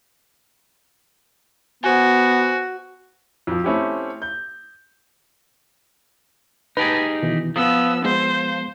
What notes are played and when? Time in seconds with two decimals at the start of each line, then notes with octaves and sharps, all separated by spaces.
1.84 B3 F#4 C5 G#5
3.47 F2 F3
3.64 A3 C4 C#4 E4 G4
4.22 G6
6.77 D#4 G4 G#4 B4 A5 A6
7.23 B2 D#3 E3
7.56 F3 B3 D#6 E6
8.05 G#3 B3 C5